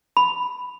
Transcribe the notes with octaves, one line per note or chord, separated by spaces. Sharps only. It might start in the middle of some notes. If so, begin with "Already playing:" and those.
B5